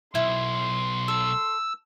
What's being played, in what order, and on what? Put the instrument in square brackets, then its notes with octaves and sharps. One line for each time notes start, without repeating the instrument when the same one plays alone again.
[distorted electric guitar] B1 [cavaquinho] E4 [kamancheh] C6
[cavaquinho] A4 [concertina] E6